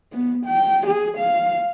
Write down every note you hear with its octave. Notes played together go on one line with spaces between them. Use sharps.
B3
G5
G#4
F5